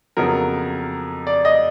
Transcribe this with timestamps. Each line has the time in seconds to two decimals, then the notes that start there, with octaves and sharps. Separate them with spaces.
0.17 F2 C#3 F#3 B3 A#4
1.27 D5
1.45 D#5